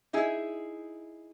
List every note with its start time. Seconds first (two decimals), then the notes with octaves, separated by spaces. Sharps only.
0.13 D#4 E4 G#4